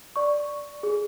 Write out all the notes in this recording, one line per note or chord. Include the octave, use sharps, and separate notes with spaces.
D5 C#6
G#4